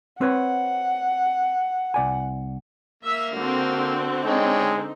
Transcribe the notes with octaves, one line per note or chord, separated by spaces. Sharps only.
C4 B4 C#5 F#5
C2 D5 G#5
A#3 E5
D3 C4 F#4
G#3 D#4 C#5 D5 G5